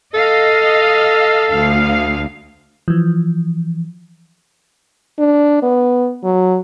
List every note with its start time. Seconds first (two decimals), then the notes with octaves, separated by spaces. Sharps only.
0.14 A4 D#5 F5
1.51 D2 F5
2.88 E3 F3
5.19 D4
5.62 B3
6.23 F#3